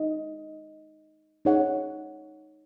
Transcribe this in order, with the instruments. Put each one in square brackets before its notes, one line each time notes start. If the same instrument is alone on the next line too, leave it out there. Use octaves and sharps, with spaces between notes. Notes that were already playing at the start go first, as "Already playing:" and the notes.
Already playing: [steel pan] D#4 D#5
D#4 G#4 C#5 F#5